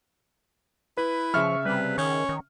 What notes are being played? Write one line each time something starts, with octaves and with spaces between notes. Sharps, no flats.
E4 B4
C#3 F3 E5 C#6 F6
C3 G3 B4
D#3 C#4 C#6
D#3